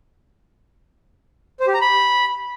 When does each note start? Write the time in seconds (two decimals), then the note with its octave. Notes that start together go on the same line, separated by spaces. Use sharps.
1.60 C5
1.67 G4
1.74 A#5
1.81 B5